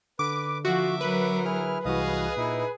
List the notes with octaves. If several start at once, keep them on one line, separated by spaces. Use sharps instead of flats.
D3 B4 D6
F3 F#4 E5 D6
F#3 A#4 B4
E4 G#4 F6
C2 E3 F#4 G#4 D#5 F5 D#6
A#2 D#4 E4